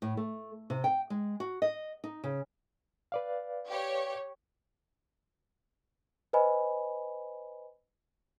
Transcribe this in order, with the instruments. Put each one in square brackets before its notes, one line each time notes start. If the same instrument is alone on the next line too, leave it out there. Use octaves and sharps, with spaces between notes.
[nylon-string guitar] A2
A3
C3
G5
G#3
F#4
D#5
D#4
C#3
[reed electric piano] B4 D5 F5
[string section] G4 C#5
[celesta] B4 C5 D#5 G#5 B5